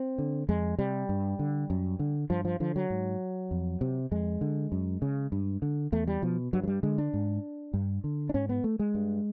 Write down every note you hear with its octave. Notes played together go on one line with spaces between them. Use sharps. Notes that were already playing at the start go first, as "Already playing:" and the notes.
Already playing: C4
D3
F2 G#3
C3 G3
G2
D3
F#2
D3
G2 F3
F3
D3 F3
F#3
G#2
F2
C3
F2 G#3
D3
F#2
C#3
G2
D3
E2 A3
G3
B2 F3
G2 F#3
F#3
G3
D3 G#3
D4
G#2
G2
D3
D4
G#2 C#4
B3
A3
G#3
G2